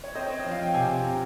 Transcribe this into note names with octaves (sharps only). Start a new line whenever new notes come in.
C#5
C4 C5 D#5
C4 C#5
F3 D#5
F5
C4 G5
C3 F5 G#5
C3
C3